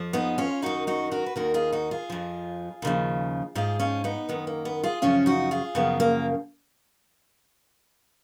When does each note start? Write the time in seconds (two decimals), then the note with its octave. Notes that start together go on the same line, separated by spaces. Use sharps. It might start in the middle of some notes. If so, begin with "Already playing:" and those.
Already playing: F2 F3
0.13 B3 D#4
0.38 C#4 F4
0.62 F#2 D#3 D#4 F#4
0.87 D#4 F#4
1.12 F#4 A#4
1.26 B4
1.36 D#2 D#3 F#4 A#4
1.54 F4 G#4
1.72 D#4 F#4
1.91 F4 G#4
2.10 F2 F3
2.82 D#2 C#3 F3
3.55 G#2 F3 F4 G#4
3.80 C#4 F4
4.04 B3 D#4
4.29 F#2 D#3 B3
4.47 A#3
4.65 B3
4.84 F4 G#4
5.02 F#2 C#3 F3 C#4 F4
5.26 D#4 F#4
5.51 F4 G#4
5.75 F#2 C#3 F3 B3
6.00 A#3